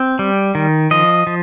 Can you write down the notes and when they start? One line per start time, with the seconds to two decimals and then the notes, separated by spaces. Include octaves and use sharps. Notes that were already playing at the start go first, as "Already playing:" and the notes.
Already playing: C4
0.19 G3
0.55 D#3
0.91 F3 D#5
1.27 F3